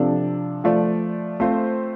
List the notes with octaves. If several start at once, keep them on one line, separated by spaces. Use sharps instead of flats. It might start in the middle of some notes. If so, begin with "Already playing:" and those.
Already playing: C3 F3 D4 A4 D5
F3 A3 F4 D5
A3 C4 F4 C5